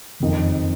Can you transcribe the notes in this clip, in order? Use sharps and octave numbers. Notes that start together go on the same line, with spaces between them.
F#1 F2 D#3